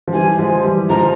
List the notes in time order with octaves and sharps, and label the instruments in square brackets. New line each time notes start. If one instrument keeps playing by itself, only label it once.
[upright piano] F3
[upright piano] E3 G3 [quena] G#5
[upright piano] F3 G#3
E3 G3
[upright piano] F3 G#3 [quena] A#5